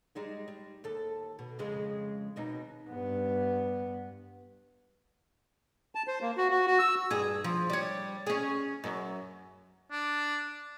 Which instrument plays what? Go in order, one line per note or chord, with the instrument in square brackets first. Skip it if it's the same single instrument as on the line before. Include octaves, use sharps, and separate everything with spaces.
[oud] G3 G#3 D#4
G3
D#2 A4
B2
F2 C#3 G#3
D#2 B2 D#4
[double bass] G2 B3
[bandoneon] A5
C5
A#3
F#4
F#4
F#4
E6
[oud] G2 G#4
F3
G3 C#5
C#4 G#4
F#2
[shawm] D4